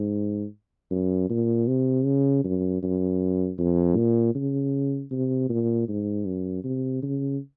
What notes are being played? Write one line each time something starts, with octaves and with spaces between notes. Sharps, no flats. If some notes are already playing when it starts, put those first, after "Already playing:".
Already playing: G#2
F#2
A#2
C3
C#3
F#2
F#2
F2
A#2
C#3
C3
A#2
G#2
F#2
C3
C#3